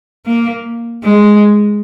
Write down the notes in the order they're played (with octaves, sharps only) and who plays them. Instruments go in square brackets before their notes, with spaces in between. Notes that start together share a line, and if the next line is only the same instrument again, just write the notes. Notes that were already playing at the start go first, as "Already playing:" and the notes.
[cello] A#3
G#3